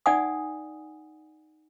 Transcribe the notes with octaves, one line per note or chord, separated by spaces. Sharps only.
D#4 D5 F#5 G#5 D#6